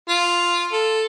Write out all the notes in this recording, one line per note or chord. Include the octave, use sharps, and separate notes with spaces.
F4
A4